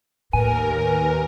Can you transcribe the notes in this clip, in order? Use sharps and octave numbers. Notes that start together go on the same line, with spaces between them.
D#2 A2 A#4 B4 G#5